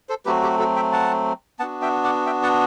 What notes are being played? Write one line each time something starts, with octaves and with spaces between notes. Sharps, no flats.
A4 C5
F#3 A3 C4 F#4 G4 B4
G4
F#4 A4
E5 G5
F#5 A5
B3 D4 F#4 F#5 A5
E5 G5
D5 F#5
E5 G5
F#5 A5